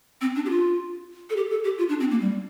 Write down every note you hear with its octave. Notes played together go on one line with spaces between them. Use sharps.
C4
D4
G4
F4
A4
G4
A4
G4
F4
D4
C4
A#3
G3